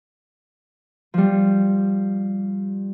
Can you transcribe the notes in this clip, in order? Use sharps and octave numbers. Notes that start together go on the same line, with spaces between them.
F3 G3